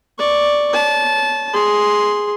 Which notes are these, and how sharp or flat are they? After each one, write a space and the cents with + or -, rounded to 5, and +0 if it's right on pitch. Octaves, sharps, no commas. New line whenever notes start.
D5 +0 C#6 +0
C#5 +0 A5 -20
G#4 +0 C6 +0